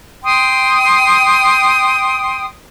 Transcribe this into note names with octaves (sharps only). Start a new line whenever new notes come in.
G5 C6 D#6